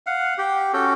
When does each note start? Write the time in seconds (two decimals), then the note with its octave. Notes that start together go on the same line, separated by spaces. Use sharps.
0.07 F5 F#5
0.38 G4 G5
0.73 C#4 F#4 A4 G5